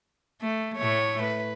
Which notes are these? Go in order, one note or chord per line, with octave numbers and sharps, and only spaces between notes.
A3
A2 A3 C#5
B4